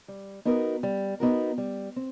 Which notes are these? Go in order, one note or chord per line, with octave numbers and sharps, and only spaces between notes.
G3
B3 D#4 F#4 A#4
G3
B3 D#4 F#4 A#4
G3
C4